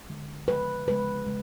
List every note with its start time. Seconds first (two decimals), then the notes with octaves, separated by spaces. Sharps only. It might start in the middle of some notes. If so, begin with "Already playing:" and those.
0.09 D3 G#3
0.48 C#3 F3 G#3 B4
0.87 C#3 F3 G#3 B4
1.26 C#3 G#3